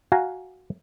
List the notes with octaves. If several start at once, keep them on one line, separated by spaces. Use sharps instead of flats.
F#4 F5 G#5 A#5